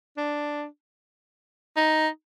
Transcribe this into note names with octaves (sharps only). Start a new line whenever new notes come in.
D4
D#4